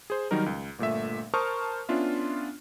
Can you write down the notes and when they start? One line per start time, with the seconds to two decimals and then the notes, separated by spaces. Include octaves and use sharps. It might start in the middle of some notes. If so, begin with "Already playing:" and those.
0.10 G#4 C5
0.31 D#3 F#3 G3 D#4 A#4
0.46 C#2
0.79 G1 A#2 A3 E5
1.34 A#4 C5 A5 C#6 D#6 F6
1.89 B3 C#4 D4 F4 E5